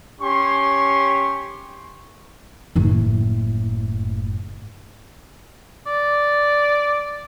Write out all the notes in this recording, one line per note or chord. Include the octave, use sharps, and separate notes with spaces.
C#4 G4 C6 C#6
F#1 A2
D5